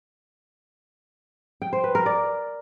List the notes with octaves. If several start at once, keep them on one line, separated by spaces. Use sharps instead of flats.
G5
C5
B4
A#4
D5